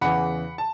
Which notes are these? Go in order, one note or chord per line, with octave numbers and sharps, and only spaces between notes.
E2 C#3 E3 F#5 B5
A5